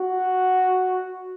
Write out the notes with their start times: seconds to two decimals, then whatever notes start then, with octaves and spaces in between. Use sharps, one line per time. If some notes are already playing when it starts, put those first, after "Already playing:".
Already playing: F#4